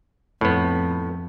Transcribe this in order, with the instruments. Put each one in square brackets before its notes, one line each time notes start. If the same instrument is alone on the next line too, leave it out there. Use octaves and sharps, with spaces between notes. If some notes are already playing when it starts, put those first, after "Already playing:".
[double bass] F2 [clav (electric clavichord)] A2 B3